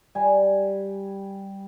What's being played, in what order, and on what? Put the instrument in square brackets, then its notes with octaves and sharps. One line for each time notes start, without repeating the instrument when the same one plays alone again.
[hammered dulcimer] G3 G#5